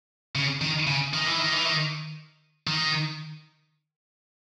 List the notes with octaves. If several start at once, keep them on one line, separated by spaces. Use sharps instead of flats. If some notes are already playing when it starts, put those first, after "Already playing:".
C#3
D#3
C#3
D#3
E3
D#3
E3
D#3
D#3